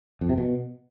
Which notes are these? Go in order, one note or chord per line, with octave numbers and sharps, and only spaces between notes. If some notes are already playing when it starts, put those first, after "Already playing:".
F2
C3
B2